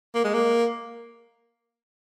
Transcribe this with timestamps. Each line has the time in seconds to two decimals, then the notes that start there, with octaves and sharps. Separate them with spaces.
0.15 A#3
0.24 G#3
0.34 A#3